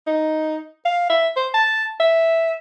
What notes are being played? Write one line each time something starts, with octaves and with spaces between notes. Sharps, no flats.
D#4
F5
E5
C5
A5
E5